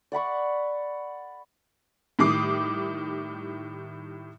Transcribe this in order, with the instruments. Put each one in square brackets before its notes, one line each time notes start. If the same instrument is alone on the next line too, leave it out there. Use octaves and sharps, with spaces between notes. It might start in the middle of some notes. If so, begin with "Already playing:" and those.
[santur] D5 F#5 B5 C#6
[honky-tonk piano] A2 D#3 G3 D6 D#6 C7